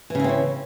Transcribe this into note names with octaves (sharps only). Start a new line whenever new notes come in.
C#3 E3 C4 C#4 E4